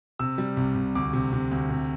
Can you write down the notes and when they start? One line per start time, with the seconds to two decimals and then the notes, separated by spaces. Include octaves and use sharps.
0.19 C3 E6
0.38 G3
0.57 C2
0.75 C2
0.95 D2 D6
1.13 C3
1.33 C3
1.51 D2
1.70 C3